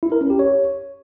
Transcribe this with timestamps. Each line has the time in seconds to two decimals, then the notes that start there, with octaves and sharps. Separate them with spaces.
0.03 E4
0.12 A#4
0.21 C#4
0.30 G4
0.39 C#5